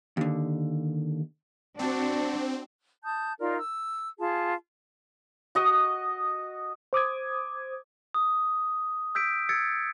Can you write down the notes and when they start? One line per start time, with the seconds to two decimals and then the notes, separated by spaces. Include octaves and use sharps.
0.17 D#2 D3
1.79 C4 D4 F#4
3.04 A5 D#6 G6
3.39 D#4 F4 A#4 D5
3.59 E6
4.19 F4 G#4 A5
5.55 F#4 D#5 D#6
6.93 C5 D6 D#6 G#6
8.14 D#6
9.15 E6 G6 B6 D7
9.49 E6 G#6 A6 C#7